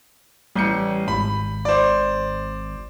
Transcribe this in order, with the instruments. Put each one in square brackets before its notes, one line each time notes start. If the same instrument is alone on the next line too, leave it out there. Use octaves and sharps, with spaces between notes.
[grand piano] A1 G6 C#7 [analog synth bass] G3
[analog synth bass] G#1 [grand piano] B5
[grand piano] C5 D5